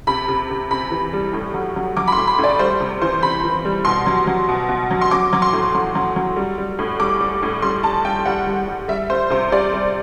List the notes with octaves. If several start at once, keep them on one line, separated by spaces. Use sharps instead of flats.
C3 B5
C3
C3
C3 B5
E3
G3
A2
F#3
F#3
F#3 D6
B5
C6
A2
B5
A2
D5
G3 C5
C3
E3 C5
C3 B5
E3
G3
B2 C6
F#3
F#3
B2
B2
F#3
C6
F#3 D6
F#3
C6
A2
F#3
F#3
F#3
G3
G3
A2
G3 D6
G3
A2
G3 C6
G3 A5
G3 G5
G3 F#5
G3
G3
G3 E5
G3 C5
C3 C5
G3 D5
G3